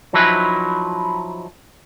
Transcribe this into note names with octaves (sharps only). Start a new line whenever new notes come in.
F3 F#3 D#4 E4 B4